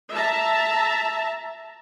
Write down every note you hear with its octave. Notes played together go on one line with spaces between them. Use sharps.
E5 A5 A#5